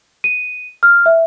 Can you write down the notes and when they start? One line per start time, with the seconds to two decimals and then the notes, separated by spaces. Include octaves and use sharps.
0.24 D#7
0.83 F6
1.06 E5